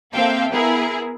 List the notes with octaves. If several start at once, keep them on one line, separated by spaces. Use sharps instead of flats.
A#3 C4 A4 E5 F5 G5
B3 E4 G#4 A#4